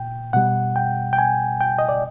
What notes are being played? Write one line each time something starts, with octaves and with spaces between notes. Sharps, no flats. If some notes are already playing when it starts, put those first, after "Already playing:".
Already playing: A#2 G5
B2 G3 F#5
G5
G5
G#5
G5
D#5
D5